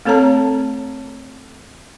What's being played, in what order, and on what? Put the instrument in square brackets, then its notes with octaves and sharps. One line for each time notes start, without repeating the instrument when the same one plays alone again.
[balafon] A3 C4 A4 C#5 A5 A#5